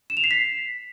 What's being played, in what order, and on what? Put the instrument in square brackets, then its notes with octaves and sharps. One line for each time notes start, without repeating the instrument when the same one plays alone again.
[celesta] E7
F7
C7
B6